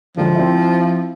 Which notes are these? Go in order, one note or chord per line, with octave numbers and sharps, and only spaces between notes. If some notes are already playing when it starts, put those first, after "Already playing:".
C#2 D3 F3
C4 E4